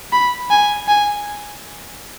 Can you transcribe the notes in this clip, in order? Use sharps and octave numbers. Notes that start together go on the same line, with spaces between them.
B5
G#5
G#5